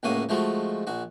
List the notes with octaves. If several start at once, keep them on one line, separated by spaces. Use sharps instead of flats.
C#2 A2 A#3 F#4 D#6
F3 G#3 A3 F#4
A#1 F#4